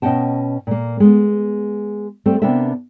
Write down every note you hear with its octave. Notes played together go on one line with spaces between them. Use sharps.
B2 C#4 D#5 F#5 G5 A5
A#2 A#3
G#3 B3
G3 A3 C4 A4
C3 B3 C4 D4 A#4 E5